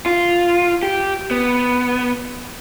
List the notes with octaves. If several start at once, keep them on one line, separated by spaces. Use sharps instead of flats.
F4
G4
B3